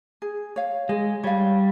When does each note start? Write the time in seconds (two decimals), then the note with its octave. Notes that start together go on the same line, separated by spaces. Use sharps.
0.22 G#4
0.56 C#5 F5
0.89 G#3 G#4
1.23 G3 C#5 F5